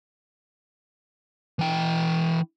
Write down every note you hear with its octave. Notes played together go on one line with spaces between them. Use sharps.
E3 G5